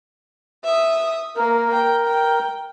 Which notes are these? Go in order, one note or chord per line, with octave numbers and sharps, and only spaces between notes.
E5 D#6
A#3 A#4
G5
G5